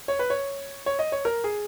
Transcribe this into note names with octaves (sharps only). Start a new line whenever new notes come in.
C#5
B4
C#5
C#5
D#5
C#5
A#4
G#4